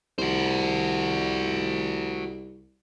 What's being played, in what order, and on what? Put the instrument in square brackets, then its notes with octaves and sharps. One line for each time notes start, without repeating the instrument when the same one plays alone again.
[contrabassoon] C2 [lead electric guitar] F#4 C5